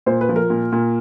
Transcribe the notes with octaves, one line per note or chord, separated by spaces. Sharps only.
A#2 C5
B4
F3
A#4
A#2
A#2